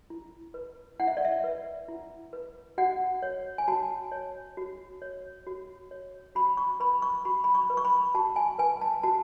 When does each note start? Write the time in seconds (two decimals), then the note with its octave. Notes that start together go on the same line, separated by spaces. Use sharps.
0.10 E4
0.54 B4
1.00 E4 F#5
1.07 E5
1.17 D5
1.25 E5
1.44 B4
1.88 E4
2.33 B4
2.78 F#4 F#5
3.22 C#5
3.58 G#5
3.68 F#4 A5
4.12 C#5
4.57 F#4
5.02 C#5
5.47 F#4
5.91 C#5
6.35 F#4 B5
6.57 C#6
6.80 B4 B5
7.02 C#6
7.25 F#4 B5
7.44 B5
7.55 C#6
7.70 B4
7.77 C#6
7.85 B5
8.15 F#4 A5
8.36 G#5
8.58 B4 G#5
8.81 A5
9.03 F#4 A5